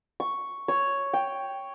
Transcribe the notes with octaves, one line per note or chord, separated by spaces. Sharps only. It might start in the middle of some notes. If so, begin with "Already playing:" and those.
C#6
C#5
G5